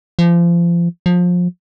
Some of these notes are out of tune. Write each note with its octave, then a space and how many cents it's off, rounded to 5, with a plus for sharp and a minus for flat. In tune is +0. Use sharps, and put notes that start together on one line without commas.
F3 -30
F3 +25